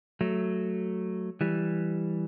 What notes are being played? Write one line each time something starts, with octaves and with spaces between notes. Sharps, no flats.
F#3 A3
E3 G3